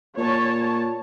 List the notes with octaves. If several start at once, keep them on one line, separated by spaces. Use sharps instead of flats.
A#2 C#5 A5